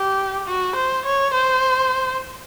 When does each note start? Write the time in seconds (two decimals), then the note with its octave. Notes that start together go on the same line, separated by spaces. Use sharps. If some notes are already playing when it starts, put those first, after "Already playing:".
Already playing: G4
0.48 F#4
0.76 C5
1.05 C#5
1.33 C5